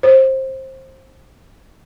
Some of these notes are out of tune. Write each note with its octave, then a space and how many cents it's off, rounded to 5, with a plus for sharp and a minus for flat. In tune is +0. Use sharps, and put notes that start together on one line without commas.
C5 +20